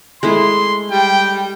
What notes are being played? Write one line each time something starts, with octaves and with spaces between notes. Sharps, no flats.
G#3 A3 E4 C6
G3 G5